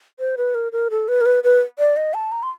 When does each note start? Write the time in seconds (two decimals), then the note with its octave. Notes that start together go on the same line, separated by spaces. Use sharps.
0.19 C5
0.37 B4
0.55 A#4
0.72 A#4
0.91 A4
1.08 B4
1.21 A#4
1.26 B4
1.44 B4
1.79 D5
1.97 D#5
2.14 A5
2.32 A#5
2.43 C6